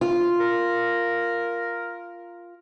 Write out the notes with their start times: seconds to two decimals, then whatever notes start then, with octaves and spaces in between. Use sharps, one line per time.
0.01 F4
0.40 A#4